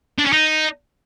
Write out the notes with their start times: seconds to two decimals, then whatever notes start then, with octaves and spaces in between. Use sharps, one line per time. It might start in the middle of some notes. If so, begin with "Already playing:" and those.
0.18 D4
0.26 C#4
0.33 D#4